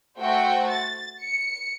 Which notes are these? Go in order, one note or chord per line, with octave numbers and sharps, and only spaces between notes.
A3 F#4 C5 G5
A6
C#7